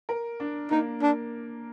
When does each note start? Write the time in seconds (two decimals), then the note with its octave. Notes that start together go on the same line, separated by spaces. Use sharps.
0.09 A#4
0.40 D4
0.71 A#3 D#4
1.02 D4